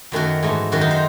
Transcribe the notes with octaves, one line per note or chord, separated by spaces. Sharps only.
F#2 D#3 F#3 A3 F#4
G#2 E3 A3
F#2 D#3 F#3 F#4
D#4
C5